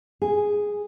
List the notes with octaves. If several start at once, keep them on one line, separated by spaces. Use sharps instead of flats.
G#4